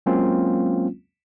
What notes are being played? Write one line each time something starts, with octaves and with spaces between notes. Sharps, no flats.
F#3 G#3 A#3 C4 C#4 F4